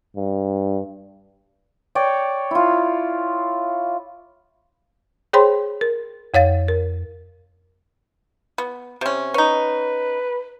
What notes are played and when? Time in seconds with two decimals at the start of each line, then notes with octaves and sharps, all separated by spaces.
0.16 G2
1.95 C#5 D5 G5
2.51 E4 F4
5.33 G#4 C5 C#5 G5 B5 C6
5.81 A#4
6.34 F2 C#5 F5 A6
6.68 A#4
8.58 B3
9.01 C3 C#4
9.34 C#4 D#4 B4